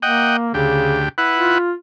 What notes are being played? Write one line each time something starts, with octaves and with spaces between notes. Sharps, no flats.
A#3 D#5 F#5 G5
D2 C#3 G4
E4 B4 F#5
F4